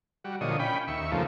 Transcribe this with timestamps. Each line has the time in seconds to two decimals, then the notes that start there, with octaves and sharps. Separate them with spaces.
0.24 G3 F#4
0.41 A#2 D3 F3 C#5 D#5
0.59 C#4 G5 B5
0.88 D#2 E5 C#6
1.12 F2 C#3 F3 A3 A#3